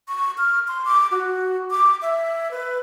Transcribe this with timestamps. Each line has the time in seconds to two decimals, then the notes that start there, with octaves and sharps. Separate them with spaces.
0.08 C#6
0.38 F6
0.68 C6
0.85 D6
1.11 F#4
1.71 D6
2.02 E5
2.51 B4